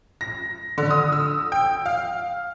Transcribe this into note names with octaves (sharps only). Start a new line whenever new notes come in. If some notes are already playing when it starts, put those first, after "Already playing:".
A#6
D3
D#6
E6
G5
F5